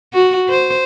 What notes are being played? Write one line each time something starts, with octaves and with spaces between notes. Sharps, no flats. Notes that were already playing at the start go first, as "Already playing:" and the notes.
F#4
C5